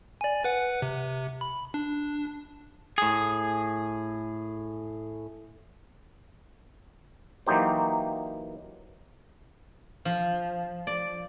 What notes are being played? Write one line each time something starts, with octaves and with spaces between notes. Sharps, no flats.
D5 G#5
B4 F#5
C3
B5
D4
A2 G#4
E3 F#3 A#3 D#4 G4 C5
F3
D5